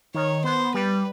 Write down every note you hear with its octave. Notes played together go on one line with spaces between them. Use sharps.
D#3 C#5
B3 C5
G3 B4